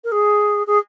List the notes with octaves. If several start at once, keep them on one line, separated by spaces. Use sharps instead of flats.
A#4
G#4
G#4